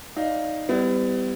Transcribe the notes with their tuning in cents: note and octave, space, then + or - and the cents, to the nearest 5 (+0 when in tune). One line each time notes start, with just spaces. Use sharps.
D#4 +0 D5 -10 F5 +0
G3 +0 B3 +40 E4 +0